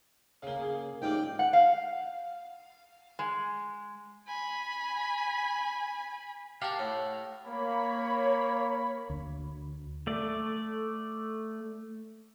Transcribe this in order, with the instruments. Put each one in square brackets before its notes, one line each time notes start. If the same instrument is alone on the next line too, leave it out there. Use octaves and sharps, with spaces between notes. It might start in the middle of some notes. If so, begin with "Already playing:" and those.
[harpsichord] C#3 A#3 [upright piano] F5 G7
[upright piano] G#4
[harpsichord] A1 F4 D5 [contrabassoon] G#2 [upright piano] G4 D#5 [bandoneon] G5
[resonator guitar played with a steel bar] F#5
F5
G#3
[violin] G#5 B5
[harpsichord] G4 A#4 [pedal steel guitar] F5 F#5 A5
[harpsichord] A2
[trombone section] A#3 [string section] C#5 B5
[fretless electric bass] D2
[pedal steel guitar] A3 D5